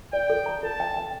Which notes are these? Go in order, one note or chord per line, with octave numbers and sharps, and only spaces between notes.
D5 G5
A4
A#5
A4 A5
G5
G5